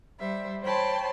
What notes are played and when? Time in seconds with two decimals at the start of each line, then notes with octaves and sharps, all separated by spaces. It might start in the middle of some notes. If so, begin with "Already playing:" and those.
0.19 G3 C5 E5
0.63 C5 C#5 G5 A5 B5 C6